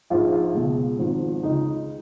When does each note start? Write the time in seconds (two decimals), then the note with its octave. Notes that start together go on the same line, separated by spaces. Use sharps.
0.10 A#1 G#2 F3 G#3 F4
0.32 F4
0.54 C#2 B2 G#3
0.99 G#1 G#2 F3
1.43 C#2 C#3 G#3 D#4